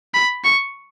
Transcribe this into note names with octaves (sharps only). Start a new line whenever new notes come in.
B5
C#6